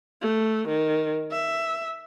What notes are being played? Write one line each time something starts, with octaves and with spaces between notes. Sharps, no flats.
A3
D#3
E5